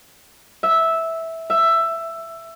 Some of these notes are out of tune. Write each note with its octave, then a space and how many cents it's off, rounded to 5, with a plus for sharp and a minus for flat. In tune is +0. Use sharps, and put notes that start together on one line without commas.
E5 -10
E5 +10